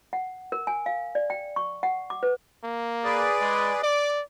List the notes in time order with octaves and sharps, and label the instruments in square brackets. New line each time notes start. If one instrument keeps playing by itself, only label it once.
[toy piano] F#5
A#4
G#5
F5
D5
G5
C#6
F#5
D6
B4
[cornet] A#3
[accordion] G#4 B4 D5
[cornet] G#3
[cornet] D5 [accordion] D6